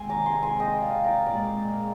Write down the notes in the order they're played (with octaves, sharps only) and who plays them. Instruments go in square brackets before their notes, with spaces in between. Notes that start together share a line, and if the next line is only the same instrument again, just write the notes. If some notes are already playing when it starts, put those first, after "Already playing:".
Already playing: [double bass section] C3 D#3 G#3 C4 [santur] G#5 C6
[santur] A#5 D6
G#5 C6
G#5 C6
D#5 G5
D5 F5
A#4 D5
[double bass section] A#2 G#3 C4 [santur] A#4 D5